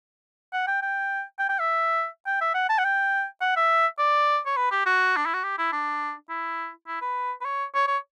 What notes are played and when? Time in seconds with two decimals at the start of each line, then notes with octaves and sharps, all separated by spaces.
0.53 F#5
0.67 G5
0.82 G5
1.39 G5
1.49 G5
1.59 E5
2.26 G5
2.41 E5
2.54 F#5
2.69 A5
2.78 F#5
2.84 G5
3.41 F#5
3.56 E5
3.99 D5
4.46 C#5
4.57 B4
4.71 G4
4.86 F#4
5.17 D4
5.26 E4
5.34 F#4
5.43 G4
5.58 E4
5.72 D4
6.29 E4
6.87 E4
7.02 B4
7.41 B4
7.45 C#5
7.74 C#5
7.88 C#5